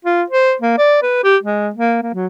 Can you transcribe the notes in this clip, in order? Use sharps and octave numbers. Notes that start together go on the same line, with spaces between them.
F4
C5
A#3
D5
B4
G4
G#3
A#3
A#3
F#3